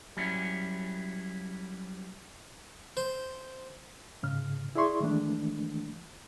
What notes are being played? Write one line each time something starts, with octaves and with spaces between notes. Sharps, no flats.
F#3 G3 C#4 E4
C5
G#2 C#3 F6
E4 G#4 D5 E5 C6 C#6
D#3 E3 G#3 A3 D4